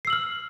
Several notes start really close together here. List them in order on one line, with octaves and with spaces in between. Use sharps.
C7 E6 F#7 F6